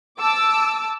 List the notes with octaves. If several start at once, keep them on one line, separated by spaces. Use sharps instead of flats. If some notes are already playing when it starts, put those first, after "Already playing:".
A5 D6 E6